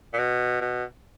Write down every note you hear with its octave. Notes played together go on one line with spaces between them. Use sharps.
A#2
B2
B2